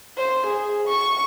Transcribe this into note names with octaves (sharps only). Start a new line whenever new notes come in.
C5
G#4
C#6